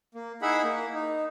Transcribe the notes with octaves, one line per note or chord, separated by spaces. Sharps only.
A#3
D#4 E4 G#4 E5 F#5 B5
A#3
D#4